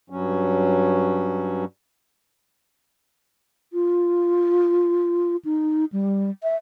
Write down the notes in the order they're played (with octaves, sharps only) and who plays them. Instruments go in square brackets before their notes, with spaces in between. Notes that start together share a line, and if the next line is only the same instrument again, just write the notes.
[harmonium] G2 F#3 C#4
[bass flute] F4
D#4
G3
E5